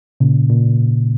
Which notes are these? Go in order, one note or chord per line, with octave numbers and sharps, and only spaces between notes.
A#2 C#3
A#2